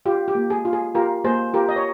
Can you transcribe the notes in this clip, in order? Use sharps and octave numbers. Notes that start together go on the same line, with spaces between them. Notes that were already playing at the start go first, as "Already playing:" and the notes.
F4 G4
G4
A#3
G#4
F4
G#4
F4 G4 A#4
A#3 G#4 C5
F4 G4 A#4
D#5
C#5